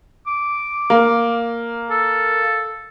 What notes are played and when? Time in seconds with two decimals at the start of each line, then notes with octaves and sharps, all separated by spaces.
0.27 D6
0.90 A#3
1.90 A4